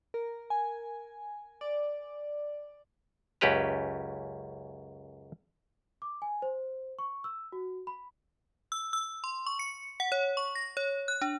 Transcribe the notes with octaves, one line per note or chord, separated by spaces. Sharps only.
A#4
G#5
D5
C#2 F#2 C#4 G4 B4 A#5
D6
G#5
C5
C#6
E6
F#4
B5
E6
E6
C6
C#6
C#7
F#5
C#5
C#6
A#6
C#5
F#6
D4